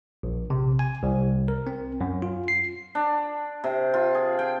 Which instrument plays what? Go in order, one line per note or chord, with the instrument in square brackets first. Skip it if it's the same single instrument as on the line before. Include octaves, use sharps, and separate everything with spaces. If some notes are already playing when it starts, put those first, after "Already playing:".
[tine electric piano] A#1
C3
G#5
C2
A#4
C4
F#2
F4
C7
[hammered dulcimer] D4
C3
F4
G#4
G5